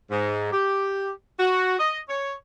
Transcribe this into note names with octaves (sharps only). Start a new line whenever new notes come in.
G#2
G4
F#4
D#5
C#5